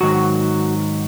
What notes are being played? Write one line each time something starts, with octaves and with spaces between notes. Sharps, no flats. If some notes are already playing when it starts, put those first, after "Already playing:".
G#2 D#3 F#3 F#4